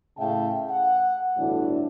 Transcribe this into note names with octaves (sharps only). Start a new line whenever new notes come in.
A2 C#3 E5 F5 G5 A5
F#5
G1 D2 A2 E3 D4 F#4